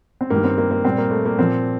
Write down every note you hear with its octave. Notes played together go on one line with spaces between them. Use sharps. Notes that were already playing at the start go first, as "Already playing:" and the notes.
C4
G2 D#3 G3 A#3
C4
A#3
A#3
A#2 G3 C4
A#3
A3
A#3
A#2 F3 C4